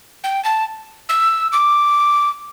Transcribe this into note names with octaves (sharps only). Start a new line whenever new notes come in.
G5
A5
E6
D6